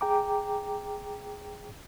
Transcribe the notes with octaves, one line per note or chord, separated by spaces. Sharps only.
G#4 G5 A#5 D6